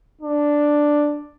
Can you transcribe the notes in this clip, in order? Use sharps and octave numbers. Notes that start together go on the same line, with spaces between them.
D4